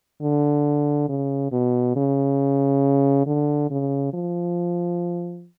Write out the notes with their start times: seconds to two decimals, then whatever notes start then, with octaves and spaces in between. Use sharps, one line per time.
0.22 D3
1.09 C#3
1.52 B2
1.96 C#3
3.26 D3
3.70 C#3
4.13 F3